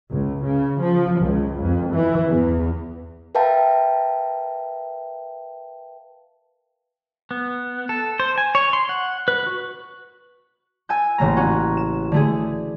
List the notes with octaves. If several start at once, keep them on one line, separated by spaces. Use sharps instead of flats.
C#2
C#3
F3
C#2
F2
E3
E2
A#4 B4 E5 F5 G5 A5
B3
A4
C5
G#5
C#5
C6
F#5
B4
F#4
G#5 A5 E6 G6
A1 C#3 A#3 A#5
C#4 F#4
E7
D3 A3 G#4